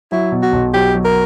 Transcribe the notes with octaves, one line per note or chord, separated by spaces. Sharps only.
F#3 E4
B2
F#4
B1
F#3 G4
F#3
A#4